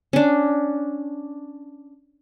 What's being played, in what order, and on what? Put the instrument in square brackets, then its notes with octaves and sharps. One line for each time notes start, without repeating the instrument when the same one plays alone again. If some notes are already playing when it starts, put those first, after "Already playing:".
[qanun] C#4 D4